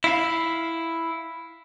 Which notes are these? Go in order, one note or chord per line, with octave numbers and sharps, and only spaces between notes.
E4 F5